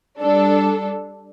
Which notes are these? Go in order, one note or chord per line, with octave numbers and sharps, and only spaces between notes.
G3 D4 A4